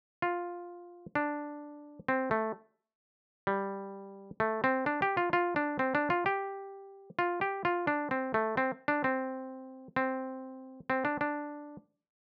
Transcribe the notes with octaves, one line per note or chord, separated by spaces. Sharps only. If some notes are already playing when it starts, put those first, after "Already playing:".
F4
D4
C4
A3
G3
A3
C4
D4
G4
F4
F4
D4
C4
D4
F4
G4
F4
G4
F4
D4
C4
A3
C4
D4
C4
C4
C4
D4
D4